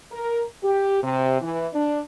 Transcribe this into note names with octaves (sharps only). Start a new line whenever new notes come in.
A#4
G4
C3
E3
D4